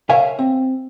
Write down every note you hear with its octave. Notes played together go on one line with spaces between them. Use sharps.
A#4 C#5 E5 F5 G#5
C4